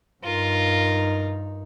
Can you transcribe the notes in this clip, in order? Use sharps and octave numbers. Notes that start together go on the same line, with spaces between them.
G2 D#4 F4 A#4